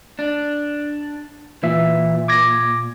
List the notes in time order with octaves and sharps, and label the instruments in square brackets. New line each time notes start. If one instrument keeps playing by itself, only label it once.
[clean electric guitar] D4
[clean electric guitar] A#2 [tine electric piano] E3 E5
[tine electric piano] D6 G#6 A#6